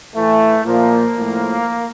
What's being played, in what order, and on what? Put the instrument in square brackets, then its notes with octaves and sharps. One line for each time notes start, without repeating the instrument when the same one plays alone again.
[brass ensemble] A2 E3 A3
A#2 F3 A#3
A2 F3